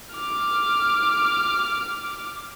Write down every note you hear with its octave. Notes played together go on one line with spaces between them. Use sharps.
D6 F6